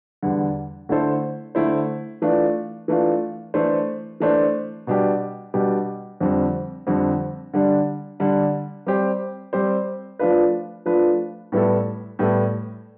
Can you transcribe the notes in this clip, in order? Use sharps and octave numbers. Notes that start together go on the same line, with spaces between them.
E2 D3 G3
D3 A3 E4 A4 C5
D3 A3 E4 A4 C5
E3 A3 D4 F4
E3 A3 D4 F4
E3 A3 D4 A4 C5
E3 A3 D4 A4 C5
B2 G3 D4 G4
B2 G3 D4 G4
F2 D3 G3 C4
F2 D3 G3 C4
D3 G3 D4
D3 G3 D4
G3 C4 G4 C5
G3 C4 G4 C5
F3 A3 D4 F4 B4
F3 A3 D4 F4 B4
A2 G3 B3 E4 A4
A2 G3 B3 E4 A4